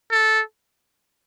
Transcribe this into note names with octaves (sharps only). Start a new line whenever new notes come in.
A4